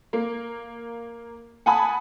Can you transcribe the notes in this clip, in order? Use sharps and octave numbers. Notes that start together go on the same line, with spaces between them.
A#3
F#5 G#5 A5 B5 D#6